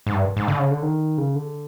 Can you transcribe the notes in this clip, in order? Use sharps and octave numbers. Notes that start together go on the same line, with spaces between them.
G#2
G2
G#2
D3
C#3
D3
D#3
C#3
D3